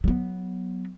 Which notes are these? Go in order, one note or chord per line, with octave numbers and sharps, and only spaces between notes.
F#3 B3